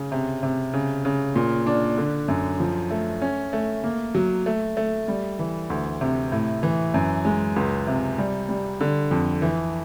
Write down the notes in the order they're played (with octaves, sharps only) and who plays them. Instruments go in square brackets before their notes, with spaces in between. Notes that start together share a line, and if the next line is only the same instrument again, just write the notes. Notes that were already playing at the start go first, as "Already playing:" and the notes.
Already playing: [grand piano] C#3
C3
C3
C#3
C#3
A#2
D4
D3
F#2
F3
A3
C#4
A3
A#3
F#3
A3
A3
G3
E3
D2
C3
A2
E3
F#2
G#3
C#2
C3
G3
G3
D3
F2
E3